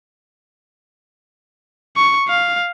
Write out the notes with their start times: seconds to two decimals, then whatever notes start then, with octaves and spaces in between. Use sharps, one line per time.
1.96 C#6
2.28 F5